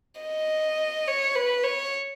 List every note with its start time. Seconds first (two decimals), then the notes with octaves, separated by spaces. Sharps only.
0.21 D#5
1.07 C#5
1.35 B4
1.63 C#5